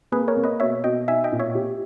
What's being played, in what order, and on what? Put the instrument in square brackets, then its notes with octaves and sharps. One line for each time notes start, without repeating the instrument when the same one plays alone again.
[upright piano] A#3 [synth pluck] G#4 B4
[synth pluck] A#4 C#5
[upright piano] A#3
[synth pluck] B4 D#5
[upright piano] B2 [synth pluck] C#5 E5
[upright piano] B2 [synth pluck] D#5 G5
[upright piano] D#4 [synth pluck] E5 G#5
[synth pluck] D#5 G5
[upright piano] A#2
[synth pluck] C#5 E5
[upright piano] G4